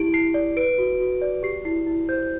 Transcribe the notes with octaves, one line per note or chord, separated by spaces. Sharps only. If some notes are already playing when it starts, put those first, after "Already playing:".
Already playing: E4 G4 D7
E4 C7
D5
B4 D7
F#4
F#4
D5
G4 C7
E4 C7
E4
C5 G6